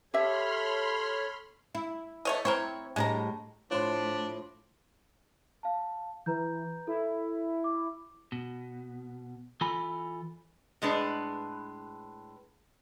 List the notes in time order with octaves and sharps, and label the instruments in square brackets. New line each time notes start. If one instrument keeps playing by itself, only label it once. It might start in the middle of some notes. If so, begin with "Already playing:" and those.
[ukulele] G4 E5 [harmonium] A4 C#5 [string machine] B5 C6 F6
[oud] E4
[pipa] A3 C#5 D#5
[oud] C4 E4 [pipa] A#4 C5 C#5
[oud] A2 G3 D4 [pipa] G#3 A#5
[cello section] A2 [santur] F3 B5 C6 [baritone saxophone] D4 [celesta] C#5
[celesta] F5 A5
[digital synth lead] E3 [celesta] B4 A#5 G6
[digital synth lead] E4 [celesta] A4
[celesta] D6
[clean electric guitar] B2
E3 F4 A4 G#5 B5
[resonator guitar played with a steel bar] A2 G#3 D4 B4